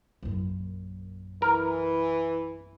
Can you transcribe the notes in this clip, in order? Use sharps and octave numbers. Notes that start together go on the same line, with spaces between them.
A#1 F#2
E3 A#4